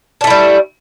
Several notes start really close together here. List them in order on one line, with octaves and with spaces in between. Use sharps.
D4 A3 E4 G3